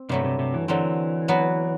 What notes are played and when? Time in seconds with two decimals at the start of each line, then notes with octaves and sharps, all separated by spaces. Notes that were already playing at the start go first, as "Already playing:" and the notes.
Already playing: C4
0.09 G2 C3 F#3 A3
0.24 C3
0.39 C3
0.54 E3
0.68 D3 E3 F#3 C4
1.28 F#3 B3 F#4